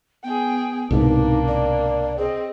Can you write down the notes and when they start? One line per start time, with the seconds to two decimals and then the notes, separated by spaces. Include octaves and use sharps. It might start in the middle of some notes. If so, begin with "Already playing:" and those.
0.24 B3 G#4 G5
0.91 C2 G#2 B2 A#3 D4 D#4
1.48 D5
2.18 C4 G#4 D#5